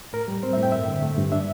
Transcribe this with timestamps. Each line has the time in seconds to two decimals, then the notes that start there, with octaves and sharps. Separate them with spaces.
0.13 A2 A#4
0.28 G3
0.43 C4 C5
0.53 E5
0.57 A2
0.63 G5
0.72 G2 E5
0.88 D3
1.02 A3
1.18 G2
1.32 D4 E5